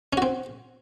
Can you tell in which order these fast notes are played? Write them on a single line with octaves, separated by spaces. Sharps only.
C#4 F#4 C4